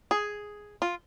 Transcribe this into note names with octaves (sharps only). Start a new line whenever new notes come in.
G#4
F4